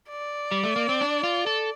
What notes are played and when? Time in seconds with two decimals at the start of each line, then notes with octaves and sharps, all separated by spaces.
0.10 D5
0.52 G3
0.63 A3
0.76 A#3
0.89 C4
1.01 D4
1.24 F4
1.46 A4